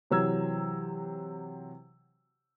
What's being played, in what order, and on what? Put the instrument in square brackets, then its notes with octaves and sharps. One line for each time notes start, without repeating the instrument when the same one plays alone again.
[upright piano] C3 E3 F#3 A#5 E6 G#6